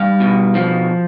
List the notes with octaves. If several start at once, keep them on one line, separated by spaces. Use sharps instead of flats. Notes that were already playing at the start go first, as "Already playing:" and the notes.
Already playing: G3 F5
B2
F3